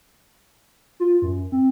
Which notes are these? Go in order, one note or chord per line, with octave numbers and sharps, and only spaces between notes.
F4
F#2
C4